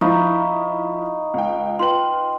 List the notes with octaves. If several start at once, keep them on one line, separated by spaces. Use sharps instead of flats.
F3 D#4 E4 F5 B5 C#6
C#2 G5
F4 B4 G5 C6 F#7